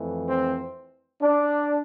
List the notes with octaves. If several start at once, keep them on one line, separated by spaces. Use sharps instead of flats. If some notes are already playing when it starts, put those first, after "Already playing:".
Already playing: F2 E3 A3
C4
D4